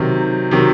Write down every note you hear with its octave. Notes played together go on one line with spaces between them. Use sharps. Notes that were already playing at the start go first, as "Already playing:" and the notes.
Already playing: C3 D#3 F#3
C3 D#3 F#3